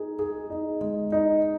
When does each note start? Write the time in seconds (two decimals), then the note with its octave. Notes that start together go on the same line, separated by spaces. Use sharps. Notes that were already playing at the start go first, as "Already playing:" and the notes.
Already playing: D#4 G#4
0.19 G#4
0.50 D#4
0.81 G#3
1.12 D#4